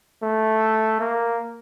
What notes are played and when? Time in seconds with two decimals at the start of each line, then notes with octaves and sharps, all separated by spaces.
0.23 A3
1.00 A#3